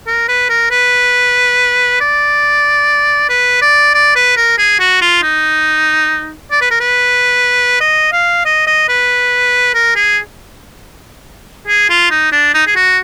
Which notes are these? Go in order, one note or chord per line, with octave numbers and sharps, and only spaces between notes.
A#4
B4
A#4
B4
D5
B4
D5
D5
B4
A#4
G#4
F#4
F4
D#4
D5
B4
A#4
B4
D#5
F5
D#5
D#5
B4
A#4
G#4
G#4
F4
D#4
D4
D#4
G#4
F#4